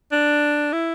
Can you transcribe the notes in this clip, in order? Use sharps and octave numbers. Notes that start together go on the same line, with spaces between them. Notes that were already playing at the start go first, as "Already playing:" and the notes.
D4
E4